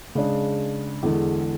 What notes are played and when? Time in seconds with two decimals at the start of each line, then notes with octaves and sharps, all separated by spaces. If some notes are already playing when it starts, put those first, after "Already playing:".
0.15 C#3 G#3 D4
1.03 E2 D3 G#3